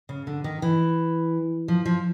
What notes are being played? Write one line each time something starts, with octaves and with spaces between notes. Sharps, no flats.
C#3
D3
D#3
E3
F3
F3